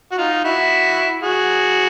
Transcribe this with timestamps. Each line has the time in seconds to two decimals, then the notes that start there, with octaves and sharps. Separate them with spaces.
0.12 F#4
0.18 D#4 F4
0.44 E4 F#4
1.23 F#4 G#4